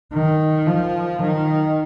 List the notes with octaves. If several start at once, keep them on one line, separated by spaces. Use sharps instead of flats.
D#3
F3
D#3